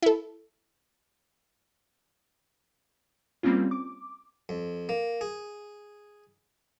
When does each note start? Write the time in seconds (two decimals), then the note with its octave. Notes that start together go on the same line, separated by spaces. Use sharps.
0.02 E4 A4
3.43 G3 A#3 C4 C#4 F4
3.71 D6
4.49 F2
4.89 A#3
5.21 G#4